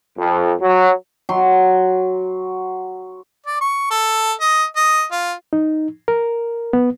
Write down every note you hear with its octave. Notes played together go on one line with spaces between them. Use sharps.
F2
F#3
F#3 C6
D5
C#6
A4
D#5
D#5
F4
D#4
A#4
B3